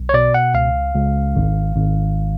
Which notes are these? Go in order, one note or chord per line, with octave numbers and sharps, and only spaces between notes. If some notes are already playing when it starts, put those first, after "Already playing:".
Already playing: B1
C#5
B2 D5
F#5
C#2 F5
C#2
G#1
G#1